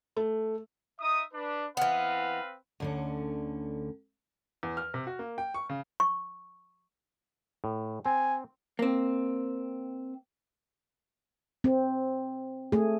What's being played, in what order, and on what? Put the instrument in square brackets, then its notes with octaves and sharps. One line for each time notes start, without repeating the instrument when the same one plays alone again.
[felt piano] A3
[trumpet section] D#4 E5 D#6
D4 B4
[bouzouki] E3 B3 [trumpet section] C4 B4 F5
[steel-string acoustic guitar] D2 D3 C#4
[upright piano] E2
F6
C3
F#4
A#3
G5
C#6
C#3
[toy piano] C#6
[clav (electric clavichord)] A2
[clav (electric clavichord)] C4 [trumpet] G#5
[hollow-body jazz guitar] A#3 C4
[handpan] C4
A3 G#4